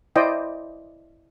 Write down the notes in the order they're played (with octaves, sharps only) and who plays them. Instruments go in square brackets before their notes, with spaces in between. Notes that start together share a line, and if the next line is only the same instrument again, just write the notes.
[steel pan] E4 C5 D5 D#5 G5